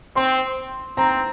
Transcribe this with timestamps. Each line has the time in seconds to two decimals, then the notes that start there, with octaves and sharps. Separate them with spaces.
0.16 C4 C6
0.97 C4 A#5